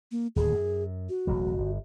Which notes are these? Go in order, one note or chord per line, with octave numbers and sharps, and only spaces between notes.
A#3
D1 D#2 G#4
F#2
F#4
E1 A1 F#3
G1